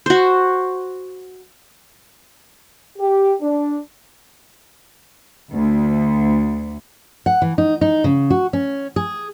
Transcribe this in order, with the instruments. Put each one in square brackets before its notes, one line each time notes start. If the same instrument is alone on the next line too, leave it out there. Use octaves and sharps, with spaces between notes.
[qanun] F#4 C5
[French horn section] G4
D4
[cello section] D2
[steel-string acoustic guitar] F#5
E3
D#4
D#4
C#3
F#4
C#4
G#4